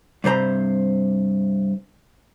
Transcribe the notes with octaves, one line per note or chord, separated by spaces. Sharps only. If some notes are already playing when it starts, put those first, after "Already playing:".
G2 C3 C5 A#5 B5